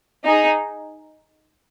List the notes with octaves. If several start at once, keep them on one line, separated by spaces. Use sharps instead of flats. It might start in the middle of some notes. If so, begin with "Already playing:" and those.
D#4 G#4